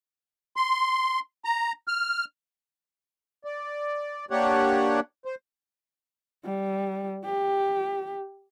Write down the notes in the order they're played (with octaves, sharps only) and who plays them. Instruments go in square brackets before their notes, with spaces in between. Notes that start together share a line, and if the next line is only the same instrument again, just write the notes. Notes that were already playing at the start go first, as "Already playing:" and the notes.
[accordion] C6
A#5
F6
D5
A#3 D4 G4 C#5 F#5
C5
[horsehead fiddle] G3
G4